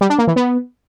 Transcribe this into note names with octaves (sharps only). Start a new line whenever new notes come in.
G3
D4
A#3
E3
B3